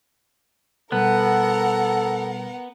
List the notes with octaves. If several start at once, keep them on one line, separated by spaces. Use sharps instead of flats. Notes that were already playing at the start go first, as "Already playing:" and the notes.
B2 G3 B3 A4 A#4 F#5